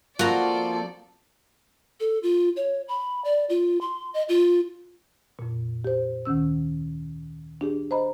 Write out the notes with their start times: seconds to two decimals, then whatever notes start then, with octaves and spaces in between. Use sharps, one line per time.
0.19 F3 A#3 C4 F4 F#4 A4 D5 A#5
2.00 A4
2.23 F4
2.56 C#5
2.88 B5
3.25 D5
3.50 F4
3.81 C6
4.14 D#5
4.29 F4
5.39 F2 A#2
5.85 G4 C5
6.25 D2 D#3 C#4 E6
7.61 D4 G4 G#4
7.91 C5 D#5 A#5 B5